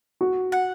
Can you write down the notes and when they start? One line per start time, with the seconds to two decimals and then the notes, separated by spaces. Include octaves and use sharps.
0.21 F#4
0.52 F#5